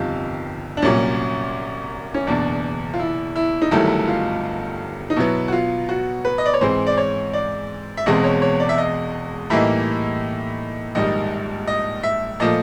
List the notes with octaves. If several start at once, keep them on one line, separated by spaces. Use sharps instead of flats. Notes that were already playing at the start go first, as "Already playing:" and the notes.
Already playing: G1 F2 C3 D#3 G3 F4
D4
C2 A#2 F#3 C#4
C#4
F#1 E2 B2 D4
F4
E4
E4
D#4
G1 G2 D#3 F#3 A3 E4
F4
D#4
B2 F#3 B3 E4
F#4
F4
F#4
B4
D#5
D5
C#5
G#2 E3 G#3 C4 C5
D5
C#5
D5
E5
E1 E2 B2 G#3 C4 D#5
C#5
C#5
D5
E5
D#5
A2 E3 G3 A#3 D#4 E5
A#1 G#2 D#3 G3 D#5
D#5
E5
A#2 F3 A3 D#5